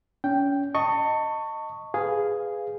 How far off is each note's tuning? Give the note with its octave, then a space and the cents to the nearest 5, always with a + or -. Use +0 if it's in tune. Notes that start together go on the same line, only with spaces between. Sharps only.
C#4 +30 G5 +0
D#5 +0 A5 +30 C#6 +0
G#4 +0 B4 +15 F5 +0